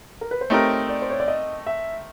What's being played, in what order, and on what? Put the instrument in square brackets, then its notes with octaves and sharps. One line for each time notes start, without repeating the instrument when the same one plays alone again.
[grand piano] A#4
B4
C5
[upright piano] A3 C4 D#4 G4 A#4 [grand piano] C#5
[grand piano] D5
C5
C#5
D5
D#5
E5